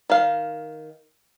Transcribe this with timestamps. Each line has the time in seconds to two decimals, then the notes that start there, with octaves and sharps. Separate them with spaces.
0.10 D#3 F5